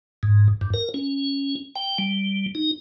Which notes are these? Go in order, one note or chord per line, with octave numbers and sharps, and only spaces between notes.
G#2
G2
A#4
C#4
G5
G3
D#4